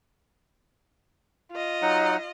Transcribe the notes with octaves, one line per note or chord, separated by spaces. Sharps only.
F4 D#5
F#3 D#4 F#5